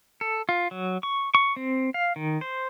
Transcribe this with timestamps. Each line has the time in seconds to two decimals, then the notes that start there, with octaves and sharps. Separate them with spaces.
0.21 A4
0.49 F4
0.71 F#3
1.03 C#6
1.35 C#6
1.56 C4
1.94 F5
2.16 D#3
2.41 C5